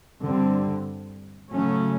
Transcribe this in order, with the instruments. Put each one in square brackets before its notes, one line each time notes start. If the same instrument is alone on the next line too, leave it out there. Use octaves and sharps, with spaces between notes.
[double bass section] G2 D3 G3 C4
C#3 F#3 A3 C#4